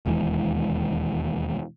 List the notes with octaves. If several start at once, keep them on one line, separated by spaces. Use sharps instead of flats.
E1 D#2 E3 G#3